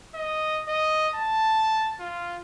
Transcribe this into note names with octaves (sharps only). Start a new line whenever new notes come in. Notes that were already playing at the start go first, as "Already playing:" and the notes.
D#5
D#5
A5
F4